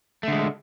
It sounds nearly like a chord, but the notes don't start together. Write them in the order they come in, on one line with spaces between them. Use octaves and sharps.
A3 D3 G#3